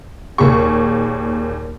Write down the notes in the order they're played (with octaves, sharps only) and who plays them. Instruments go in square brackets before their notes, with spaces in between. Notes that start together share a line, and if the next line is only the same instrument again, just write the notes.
[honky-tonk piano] D#2 A#2 G#4 C#6